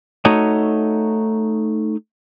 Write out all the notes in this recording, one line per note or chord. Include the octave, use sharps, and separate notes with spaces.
A3 D#4 F#4 C#5 D#5